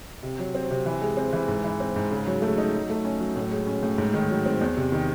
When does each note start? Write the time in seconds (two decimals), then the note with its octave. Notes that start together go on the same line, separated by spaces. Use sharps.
0.23 C3
0.39 F#3
0.55 C4
0.71 C3
0.86 E3
1.01 G#3
1.17 C4
1.33 E3
1.48 G#2
1.64 E3
1.80 C4
1.96 G#2
2.11 C#3
2.27 F#3
2.42 A3
2.58 D#4
2.73 F#3
2.90 A3
3.05 C#4
3.20 F#3
3.36 A2
3.51 G#3
3.67 C#4
3.83 A2
3.98 G#2
4.14 D#3
4.30 F#3
4.46 C4
4.61 E2
4.77 C3
4.92 D#3